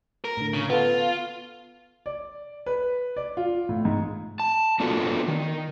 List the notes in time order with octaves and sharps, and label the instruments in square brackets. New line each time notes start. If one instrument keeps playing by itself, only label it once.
[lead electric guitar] A#4
[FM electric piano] A2 D3
[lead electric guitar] C#3
[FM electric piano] B3 A4 [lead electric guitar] F4
[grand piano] D5
B4
D5
F4
A2
G#2
[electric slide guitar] A5
B3 D4 F4 F#4 A4
D#3